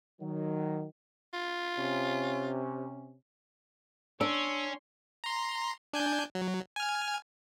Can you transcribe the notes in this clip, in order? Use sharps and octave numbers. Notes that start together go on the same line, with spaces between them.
D#3 F#3
F4
C3 C#4
C#4 D4 C#5 C6 E6 D7
A#5 C6
D4 G#5 G6
F#3
G#5 F6